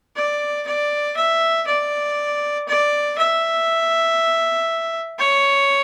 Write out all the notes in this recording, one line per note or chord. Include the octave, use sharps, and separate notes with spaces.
D5
D5
E5
D5
D5
E5
C#5